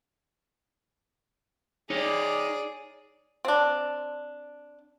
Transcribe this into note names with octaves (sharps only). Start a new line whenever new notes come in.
D#4 G#4 C#5 D5
C4 D4